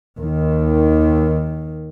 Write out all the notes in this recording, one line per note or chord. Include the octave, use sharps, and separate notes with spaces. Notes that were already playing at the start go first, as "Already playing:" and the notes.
D#2 D#3